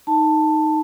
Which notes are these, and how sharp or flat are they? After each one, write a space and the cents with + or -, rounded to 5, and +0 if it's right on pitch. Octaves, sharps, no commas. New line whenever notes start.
D#4 +0 A5 +10